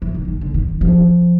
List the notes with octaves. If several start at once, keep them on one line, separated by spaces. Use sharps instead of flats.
E3
D#3
D#3
D3
D#3
F3